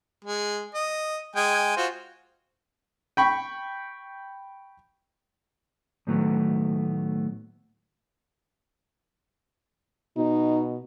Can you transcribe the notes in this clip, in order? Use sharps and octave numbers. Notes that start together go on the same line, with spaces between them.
G#3
D#5
G#3 G5 G#5
F4 F#4 C5
G5 B5 C#6
A2 D#3 F#3 A3 B3
B2 D#4